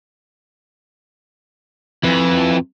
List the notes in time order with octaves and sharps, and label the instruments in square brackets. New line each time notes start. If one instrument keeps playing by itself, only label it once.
[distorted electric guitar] F2 [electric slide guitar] E4 B4